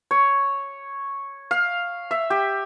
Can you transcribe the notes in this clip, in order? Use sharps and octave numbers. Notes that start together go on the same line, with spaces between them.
C#5
F5
E5
G4